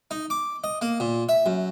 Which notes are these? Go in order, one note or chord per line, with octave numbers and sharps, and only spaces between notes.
D#4
D6
D#5
A#3
A#2
E5
F#2